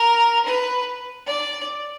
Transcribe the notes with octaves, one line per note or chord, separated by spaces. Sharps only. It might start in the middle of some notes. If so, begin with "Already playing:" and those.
Already playing: A#4
B4
D5